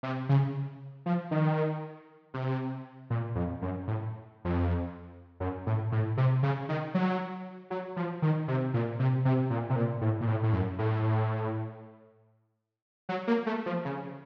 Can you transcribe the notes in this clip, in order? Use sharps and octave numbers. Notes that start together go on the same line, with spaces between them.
C3
C#3
F3
D#3
C3
A#2
F2
F#2
A2
F2
F#2
A2
A2
C3
C#3
D#3
F#3
F#3
F3
D#3
C3
A#2
C3
C3
A#2
C3
A#2
A2
A#2
A2
A2
F#2
A2
F#3
A#3
A3
F3
C#3